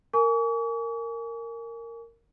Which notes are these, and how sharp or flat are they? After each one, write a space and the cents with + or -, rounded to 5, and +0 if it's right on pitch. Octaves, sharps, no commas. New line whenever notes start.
A#4 -15 G#5 +15 C#6 +45